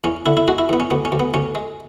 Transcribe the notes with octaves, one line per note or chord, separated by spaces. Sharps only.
E2 C#4
D3 E4
E4
G#3 F#4
E4
E2 B3
C#4
D2 B3
C#4
D2
B3
D2 C#4
G#3